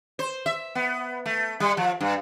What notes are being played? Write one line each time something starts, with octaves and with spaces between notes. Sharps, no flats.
C5
E5
B3
A3
G3
F3
G2